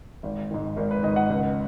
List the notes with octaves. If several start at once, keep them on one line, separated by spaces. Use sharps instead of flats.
G#1
G#2 D#3
G#1 A#4
B4
G#2 D#3 D#5
F#5
C#2